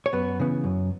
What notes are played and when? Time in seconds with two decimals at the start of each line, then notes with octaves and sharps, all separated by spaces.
0.06 C#5
0.13 F#2 B3 B4
0.40 C#3 E3 B3
0.64 F#2